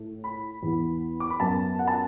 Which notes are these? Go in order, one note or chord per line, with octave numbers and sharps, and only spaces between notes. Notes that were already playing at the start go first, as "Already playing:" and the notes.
Already playing: A2 A3
B5
E2 E3 B3
D6
B5
F#2 F#3 B3 A5
F#5
A5